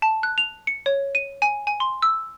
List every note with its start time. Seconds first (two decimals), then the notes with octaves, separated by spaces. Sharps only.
0.02 A5
0.23 F#6
0.38 F7
0.67 C#7
0.86 C#5
1.15 D#7
1.42 G#5
1.67 G#5
1.80 C6
2.02 E6